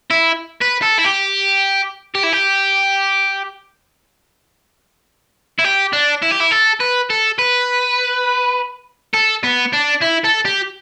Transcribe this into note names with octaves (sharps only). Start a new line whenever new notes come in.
E4
B4
A4
E4
G4
G4
E4
G4
E4
G4
D4
E4
G4
E4
A4
B4
A4
B4
A4
B3
D4
E4
A4
G4